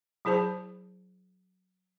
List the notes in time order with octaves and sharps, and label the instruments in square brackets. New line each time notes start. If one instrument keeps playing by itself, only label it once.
[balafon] F#3 E4 G#4 C5 A5